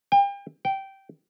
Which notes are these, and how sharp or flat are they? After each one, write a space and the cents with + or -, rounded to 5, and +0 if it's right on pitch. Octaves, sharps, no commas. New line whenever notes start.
G5 +35
G5 -15